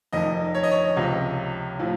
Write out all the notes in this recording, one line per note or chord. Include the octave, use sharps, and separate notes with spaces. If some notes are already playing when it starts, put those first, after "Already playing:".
F1 F2 D#3 D#5
C#5
D#5
C#5
C#2 C3 F3
A2 F3